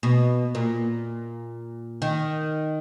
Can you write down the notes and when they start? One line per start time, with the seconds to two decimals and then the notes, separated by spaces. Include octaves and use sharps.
0.03 B2
0.55 A#2
2.02 D#3